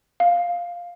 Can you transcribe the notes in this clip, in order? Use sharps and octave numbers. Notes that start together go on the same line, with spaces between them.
F5